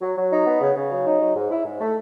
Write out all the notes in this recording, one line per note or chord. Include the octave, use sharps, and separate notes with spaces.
F#3
F#3
D#4
B3
C#3
C#3
F#3
D#4
F#3
G#2
E4
G#2
A3